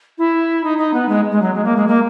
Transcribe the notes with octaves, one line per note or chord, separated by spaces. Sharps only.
E4
D#4
D#4
B3
G#3
G#3
F#3
G#3
A#3
G#3
A#3